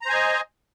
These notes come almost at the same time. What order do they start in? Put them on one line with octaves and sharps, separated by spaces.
A#5 C5 G#5 D#5